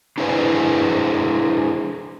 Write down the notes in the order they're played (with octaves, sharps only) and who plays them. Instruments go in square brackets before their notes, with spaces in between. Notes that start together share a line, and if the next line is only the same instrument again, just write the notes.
[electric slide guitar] D4 E4 G#4 B4 C5